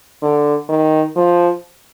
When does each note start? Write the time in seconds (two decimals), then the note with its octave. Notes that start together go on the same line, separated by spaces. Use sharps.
0.22 D3
0.69 D#3
1.16 F3